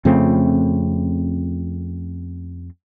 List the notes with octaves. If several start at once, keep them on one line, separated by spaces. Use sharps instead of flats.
F2 C#3 A3 C4